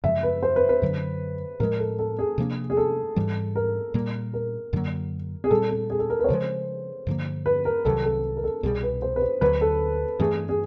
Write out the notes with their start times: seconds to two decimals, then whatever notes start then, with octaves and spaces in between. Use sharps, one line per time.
0.04 F#2 C#3 F3 G#3 E5
0.23 B4
0.43 C5
0.56 B4
0.69 B4
0.82 F#2 D3 F#3
1.60 A2 F3 G#3 A#4
1.79 A4
1.99 A4
2.19 G#4
2.38 C3 F3 A#3 D4
2.70 G#4
2.77 A4
3.16 G#2 E3 G3
3.56 A#4
3.94 A#2 G3 A#3
4.34 A#4
4.73 F#2 D3 F#3 A#3
5.44 G#4
5.50 A#2 G3 C4 A4
5.70 A4
5.90 G#4
5.99 A4
6.10 A#4
6.19 B4
6.24 C#5
6.28 D2 C#3 F3 G#3 C5
7.07 G2 D3 F3 A#3
7.46 B4
7.65 A#4
7.85 C2 C3 D#3 F#3 A4
8.05 A4
8.37 A#4
8.44 A4
8.63 C2 B2 G3 G#4
8.83 B4
9.02 C5
9.16 B4
9.22 C5
9.41 D2 D3 F#3 B4
9.61 A4
10.19 G2 E3 A3 G#4
10.49 G#4